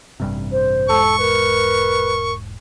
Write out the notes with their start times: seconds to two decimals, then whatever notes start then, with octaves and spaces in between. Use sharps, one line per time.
0.20 A1 G2 C3
0.51 C5
0.89 E1 G#2 A4 C#6
1.19 A#4 B4